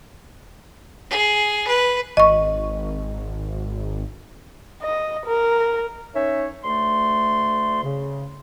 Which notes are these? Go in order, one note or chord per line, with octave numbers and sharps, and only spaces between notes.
G#4
B4
G#1 D#5 C#6
D#5
A#4
C#4 D#4 C#5 E5
D2 A3 C6
C#3